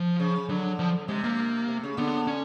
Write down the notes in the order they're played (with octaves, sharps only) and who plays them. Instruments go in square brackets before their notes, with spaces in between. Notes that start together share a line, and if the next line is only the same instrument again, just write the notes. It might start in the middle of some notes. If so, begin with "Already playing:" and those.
Already playing: [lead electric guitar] F3
[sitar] C#3
[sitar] D3 [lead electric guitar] F#3
[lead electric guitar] F3
[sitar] C3 [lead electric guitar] G#3
[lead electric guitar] A#3
[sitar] C3
C#3
[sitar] D3 [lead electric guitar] B3
[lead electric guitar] C#4